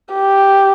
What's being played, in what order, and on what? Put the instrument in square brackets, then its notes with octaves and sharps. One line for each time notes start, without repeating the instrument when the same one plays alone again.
[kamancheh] G4